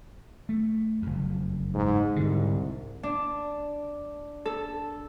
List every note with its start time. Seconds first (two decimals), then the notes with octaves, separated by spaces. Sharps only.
0.49 A3
1.02 F#1 F2
1.74 G#2
2.16 C2 G#2 D3
3.03 D4
4.45 A4